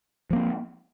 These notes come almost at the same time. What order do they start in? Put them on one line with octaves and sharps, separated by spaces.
F3 A#3 C4